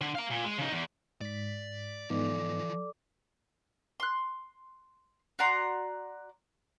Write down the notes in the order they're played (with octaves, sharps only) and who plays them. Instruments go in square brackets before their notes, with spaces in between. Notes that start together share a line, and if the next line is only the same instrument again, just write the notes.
[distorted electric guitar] D3
F5 A#5
A#2
G#3
C#3 D#4
E2
[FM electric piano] G#2 B6 [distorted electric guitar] D5
[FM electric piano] G#2 B3 D#4 [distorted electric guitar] E3 F3 [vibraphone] A4 D5 D6
[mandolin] C6 F#6
F#4 D5 A#5 C6